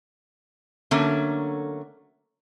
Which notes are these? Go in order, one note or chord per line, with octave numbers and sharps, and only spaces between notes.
D3 F#3 A3 A#3 C#4